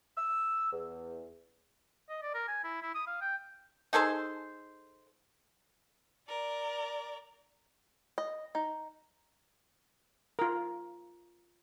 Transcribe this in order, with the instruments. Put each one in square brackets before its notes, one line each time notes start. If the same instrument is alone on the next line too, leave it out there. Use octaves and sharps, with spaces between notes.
[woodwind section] E6
E2
[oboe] D#5
D5
A#4
G#5
E4
E4
D#6
F5
G5
[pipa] D#4 G#4 A4 C5
[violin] A#4 D5
[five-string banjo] D#5
D#4
[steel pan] F4 A#4